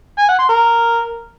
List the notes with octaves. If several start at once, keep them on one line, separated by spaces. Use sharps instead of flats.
G#5
F#5
C6
A#4